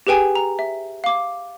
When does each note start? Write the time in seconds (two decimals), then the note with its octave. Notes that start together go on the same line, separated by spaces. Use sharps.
0.07 G4 G#4 B4 G5 G#5
0.35 A#5
0.59 E5
1.04 F5 D6